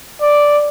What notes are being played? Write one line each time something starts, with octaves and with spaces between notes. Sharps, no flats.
D5